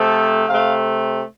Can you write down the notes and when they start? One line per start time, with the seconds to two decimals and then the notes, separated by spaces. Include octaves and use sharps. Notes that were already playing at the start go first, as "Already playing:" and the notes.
Already playing: C3 F3 A3 A4
0.48 C3 A3 F5